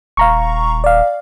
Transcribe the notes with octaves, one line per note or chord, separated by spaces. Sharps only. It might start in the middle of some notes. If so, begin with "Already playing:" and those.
D#1 F5 A#5 C#6
D5 F5